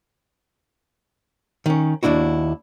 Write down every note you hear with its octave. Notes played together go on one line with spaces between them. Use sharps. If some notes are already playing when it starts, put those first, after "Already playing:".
D#3 C#4
D#2 G#2 D4 E4 F#4